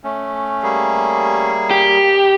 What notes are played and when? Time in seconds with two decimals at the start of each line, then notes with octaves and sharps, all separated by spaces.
0.04 A3 C#4
0.63 G3 A#3 G#4
1.71 G4